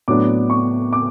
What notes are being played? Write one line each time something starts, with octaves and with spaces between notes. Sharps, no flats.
A2 F#3 B3 D4 D6
C#6
D6